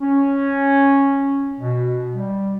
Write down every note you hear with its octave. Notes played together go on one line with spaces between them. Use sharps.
C#4
B2
G3